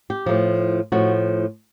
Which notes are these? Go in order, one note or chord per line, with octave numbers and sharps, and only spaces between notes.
G4
A2 F3
A2 F3 F#4